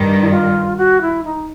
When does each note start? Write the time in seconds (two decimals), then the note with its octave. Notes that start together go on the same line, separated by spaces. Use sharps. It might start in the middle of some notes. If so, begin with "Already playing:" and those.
Already playing: G2 D#3 G3
0.21 E4
0.30 F4
0.77 F#4
1.02 E4
1.24 D#4